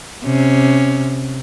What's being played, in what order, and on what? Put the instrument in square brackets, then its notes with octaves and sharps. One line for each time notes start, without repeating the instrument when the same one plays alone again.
[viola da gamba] C3 C#4